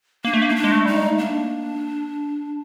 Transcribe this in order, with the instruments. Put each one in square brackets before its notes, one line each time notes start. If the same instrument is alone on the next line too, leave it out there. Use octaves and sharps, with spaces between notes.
[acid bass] A#3 [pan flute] D4
[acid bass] A3
A#3
[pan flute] D#4
D4
[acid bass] G#3
A3
[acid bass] G3 [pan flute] D#4
[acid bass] G#3
A3
[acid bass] A#3 [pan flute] D4